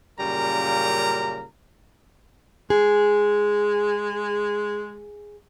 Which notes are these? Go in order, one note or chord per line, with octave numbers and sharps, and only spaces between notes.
F#2 A#2 C#3 G3 A#4 A#5
G#3 G#4